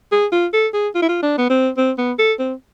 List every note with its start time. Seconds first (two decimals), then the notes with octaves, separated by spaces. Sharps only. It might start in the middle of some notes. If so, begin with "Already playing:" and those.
0.12 G#4
0.32 F4
0.53 A4
0.74 G#4
0.95 F4
1.02 E4
1.09 F4
1.23 D4
1.38 B3
1.50 C4
1.77 C4
1.98 B3
2.18 A4
2.39 C4